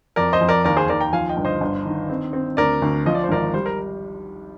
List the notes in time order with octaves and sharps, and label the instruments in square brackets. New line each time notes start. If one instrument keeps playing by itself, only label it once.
[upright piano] F2 [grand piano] A#4 D5
[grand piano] C5 D#5
[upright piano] F2
[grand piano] A#4 D5
[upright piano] D#2 [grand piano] A#4 D5
[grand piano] G#4 C5
[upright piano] D#2 [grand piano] A#4 D5
[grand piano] G5 A#5
[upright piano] F3 [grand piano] F5 G#5
[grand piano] D#5 G5
[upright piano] G1
[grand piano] C5 D#5
[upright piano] G1
D#3
C4
C4
[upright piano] D2 [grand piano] A#4 D5
[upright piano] D2
[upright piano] F3 [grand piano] D#5
[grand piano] D5
C5
[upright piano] G#1 [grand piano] A#4 D5
[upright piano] G3 [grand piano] C5
[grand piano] A#4